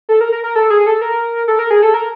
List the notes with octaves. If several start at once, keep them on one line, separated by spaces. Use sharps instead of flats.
A4
A#4
A#4
A#4
A4
G#4
A4
A#4
A4
A#4
G#4
A4
A#4